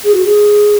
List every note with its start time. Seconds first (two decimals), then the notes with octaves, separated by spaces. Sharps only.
0.04 G#4
0.14 F#4
0.25 G#4